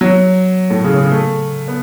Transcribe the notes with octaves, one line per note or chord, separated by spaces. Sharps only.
F#3
A2
C#3
C#3
A3
B3